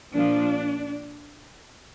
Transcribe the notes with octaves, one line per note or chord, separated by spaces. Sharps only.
A#2 F3 D4